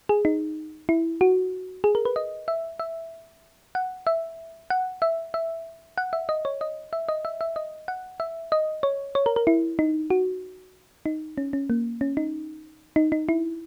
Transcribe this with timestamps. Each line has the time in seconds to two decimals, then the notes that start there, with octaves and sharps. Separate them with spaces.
0.09 G#4
0.25 D#4
0.89 E4
1.21 F#4
1.84 G#4
1.95 A#4
2.05 B4
2.16 D#5
2.48 E5
2.80 E5
3.75 F#5
4.07 E5
4.70 F#5
5.02 E5
5.34 E5
5.98 F#5
6.13 E5
6.29 D#5
6.45 C#5
6.61 D#5
6.93 E5
7.09 D#5
7.25 E5
7.41 E5
7.56 D#5
7.88 F#5
8.20 E5
8.52 D#5
8.83 C#5
9.15 C#5
9.26 A#4
9.36 A#4
9.47 E4
9.79 D#4
10.10 F#4
11.06 D#4
11.38 C#4
11.53 C#4
11.70 A#3
12.01 C#4
12.17 D#4
12.96 D#4
13.12 D#4
13.29 E4